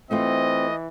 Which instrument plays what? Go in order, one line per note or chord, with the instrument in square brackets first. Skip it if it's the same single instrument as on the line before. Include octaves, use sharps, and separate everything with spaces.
[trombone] E3 [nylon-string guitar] A3 F4 C5 [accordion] C4 [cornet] D#5